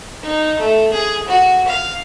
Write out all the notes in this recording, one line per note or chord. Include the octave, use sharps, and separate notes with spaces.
D#4
A3
G#4
F#4
F5